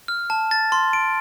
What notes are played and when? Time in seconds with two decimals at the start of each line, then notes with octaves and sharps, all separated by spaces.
0.08 F6
0.30 A5
0.51 A6
0.72 C6
0.93 D7